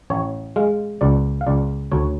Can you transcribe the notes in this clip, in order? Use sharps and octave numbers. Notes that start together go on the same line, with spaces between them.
A1 C#5
G#3 F5
C#2 D5
F5
C#2 D5
D2 C#5